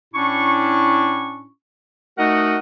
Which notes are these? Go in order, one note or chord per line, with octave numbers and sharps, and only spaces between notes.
A2 C#4 D4 E4 C#6
A3 D#4 F#4 A#4 D#5 F#5